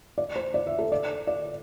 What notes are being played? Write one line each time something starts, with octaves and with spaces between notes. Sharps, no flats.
D5
C5
D5
E5
A4
D5
D5